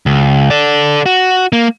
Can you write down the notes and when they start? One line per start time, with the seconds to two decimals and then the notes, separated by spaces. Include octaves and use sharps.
0.06 C#2
0.50 A4 D5
1.06 F#4
1.52 A#3